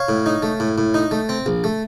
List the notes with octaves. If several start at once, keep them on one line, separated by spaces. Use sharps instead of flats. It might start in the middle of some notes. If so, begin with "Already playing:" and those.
Already playing: C#5 F5
A2
D#4
A3
A2
A2
D#4
A3
C4
A#1
A3